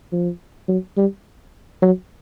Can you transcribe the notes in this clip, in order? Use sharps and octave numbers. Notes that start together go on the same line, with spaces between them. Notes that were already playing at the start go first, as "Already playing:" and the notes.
F3
F#3
G3
F#3